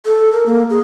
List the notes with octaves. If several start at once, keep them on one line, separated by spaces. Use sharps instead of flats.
A4
A#4
A#3
G#4